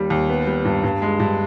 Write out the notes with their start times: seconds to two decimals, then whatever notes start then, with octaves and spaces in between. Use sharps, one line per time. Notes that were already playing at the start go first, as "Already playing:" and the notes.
Already playing: D#2 G3
0.10 D#2
0.30 B3
0.47 G3
0.65 G2
0.84 G2
1.02 G#3
1.20 G2